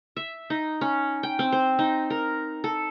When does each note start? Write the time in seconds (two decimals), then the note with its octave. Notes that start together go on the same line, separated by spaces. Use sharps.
0.17 E5
0.50 D#4
0.81 C#4
1.23 G5
1.39 C4
1.52 C5
1.79 D#4
2.10 A#4
2.64 A4